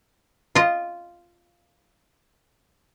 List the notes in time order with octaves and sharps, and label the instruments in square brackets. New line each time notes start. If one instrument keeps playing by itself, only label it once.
[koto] F4 D#5